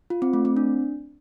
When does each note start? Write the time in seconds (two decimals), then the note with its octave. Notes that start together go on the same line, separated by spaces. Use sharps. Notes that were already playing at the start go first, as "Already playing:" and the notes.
0.10 F4
0.22 C4
0.33 A3
0.45 C4
0.57 D4